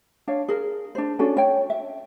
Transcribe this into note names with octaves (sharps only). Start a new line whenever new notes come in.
D4 C#5 F5
G#4 A#4
D4 C5
C#4 D4 F#4 A4
C#5 G5
E5